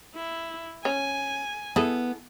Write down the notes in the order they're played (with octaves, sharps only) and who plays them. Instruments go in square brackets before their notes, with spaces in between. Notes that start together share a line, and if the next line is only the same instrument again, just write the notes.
[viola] E4
[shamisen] C#4 [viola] G#5
[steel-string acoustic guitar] B3 [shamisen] E4 G#4 A4